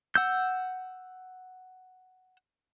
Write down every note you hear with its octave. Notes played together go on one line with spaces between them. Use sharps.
F#5 E6 G6